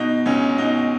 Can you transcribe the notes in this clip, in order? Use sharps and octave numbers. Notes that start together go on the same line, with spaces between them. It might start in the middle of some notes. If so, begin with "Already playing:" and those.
Already playing: B2 D#4
C#2 C#4
B2 D#4